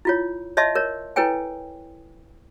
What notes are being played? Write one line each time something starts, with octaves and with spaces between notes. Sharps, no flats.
E4 F4 C#5
C#5 D#5 E5 A5 C6
A#4 C#5
E4 A4 B4 C#5 G5 G#5